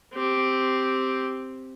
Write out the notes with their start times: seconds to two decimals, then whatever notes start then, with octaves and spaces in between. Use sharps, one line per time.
0.13 C4 G4